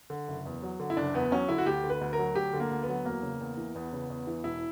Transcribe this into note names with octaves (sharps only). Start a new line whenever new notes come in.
D3
F#1
E2
F#3
D3
E4
F#1 D4
E2 B3
F#3 C#4
D3 E4
F#4
D2 G4
D3
B4
D2
A#4
F#3
D2 G4
D3
A#3
D2
B3
F#3
E2 A#3
C#3
E2
E3
E2 B3
C#3
E2
E3
E1 E4